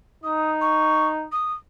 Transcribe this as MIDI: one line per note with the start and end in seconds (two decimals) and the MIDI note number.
0.24 1.27 63
0.24 0.51 87
0.61 1.08 85
1.32 1.54 87